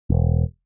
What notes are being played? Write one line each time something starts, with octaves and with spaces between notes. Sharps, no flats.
E1